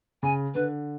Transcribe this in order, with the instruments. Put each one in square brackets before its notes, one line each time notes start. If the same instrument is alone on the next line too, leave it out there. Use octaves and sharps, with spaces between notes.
[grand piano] C#3 [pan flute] G#5
[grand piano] D3 [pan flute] B4